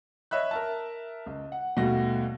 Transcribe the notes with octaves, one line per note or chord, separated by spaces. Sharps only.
C#5 D#5 E5 B5 F#6
A#4 E5 A5
C#2
F#5
D#2 B2 G3 A3 F#4 A#6